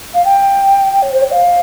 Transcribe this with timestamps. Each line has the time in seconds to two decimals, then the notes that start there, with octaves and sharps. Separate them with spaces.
0.14 F5
0.25 G5
1.02 C#5
1.12 C5
1.22 C#5
1.32 F5